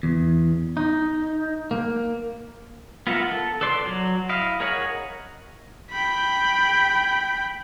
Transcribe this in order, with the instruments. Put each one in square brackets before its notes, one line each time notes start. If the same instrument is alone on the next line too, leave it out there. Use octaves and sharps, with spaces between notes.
[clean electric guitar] E2
D#4
A#3
[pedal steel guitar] B3 F4 A#4 E5 F#5
A4
A4 B4 D5 C6
F#3
E4 D#5 F5
G#4 A#4 C#5 D#5 F#5
[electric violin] G5 B5